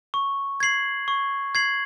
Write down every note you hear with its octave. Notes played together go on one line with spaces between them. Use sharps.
C#6
G#6 C7 F#7
C#6
G#6 C7 F#7